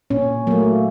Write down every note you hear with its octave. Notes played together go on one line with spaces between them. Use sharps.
A#2 C#4
F#3 A3 A#3